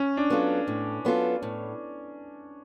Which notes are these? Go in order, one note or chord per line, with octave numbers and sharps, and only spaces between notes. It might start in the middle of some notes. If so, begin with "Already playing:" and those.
Already playing: C#4
D4
F#3 B3 F4 A4
A2
F#3 B3 F4 A4
A2